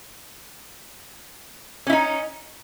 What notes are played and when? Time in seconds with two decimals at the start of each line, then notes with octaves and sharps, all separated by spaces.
1.87 C#4
1.90 E4
1.93 D#4